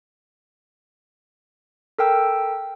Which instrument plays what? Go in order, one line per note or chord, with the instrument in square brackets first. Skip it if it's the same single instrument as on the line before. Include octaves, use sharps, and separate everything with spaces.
[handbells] A4 A#4 G5 E6